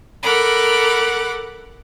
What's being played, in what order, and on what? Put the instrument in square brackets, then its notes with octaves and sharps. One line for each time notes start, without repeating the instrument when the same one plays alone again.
[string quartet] A4 A#4 F#5 B5 D6